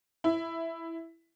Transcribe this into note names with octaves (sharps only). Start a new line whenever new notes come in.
E4